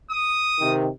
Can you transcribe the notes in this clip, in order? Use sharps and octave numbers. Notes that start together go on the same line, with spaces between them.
D#6
C3 D#3